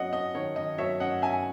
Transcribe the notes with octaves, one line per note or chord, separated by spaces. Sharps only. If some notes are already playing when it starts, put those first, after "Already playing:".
Already playing: F#3 C#4 D#5 F#5
C#4 D#5
D#3 C#5
D#3 D#5
F#3 C#5 E5
C#4 D#5 F#5
C#4 E5 G#5